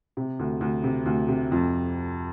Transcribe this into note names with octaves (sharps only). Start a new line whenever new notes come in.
C3
D2
D2
C3
D2
C3
F2